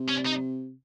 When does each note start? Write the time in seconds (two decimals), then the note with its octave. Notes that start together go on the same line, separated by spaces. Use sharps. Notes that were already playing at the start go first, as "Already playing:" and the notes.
Already playing: C3
0.09 C#4
0.27 D#4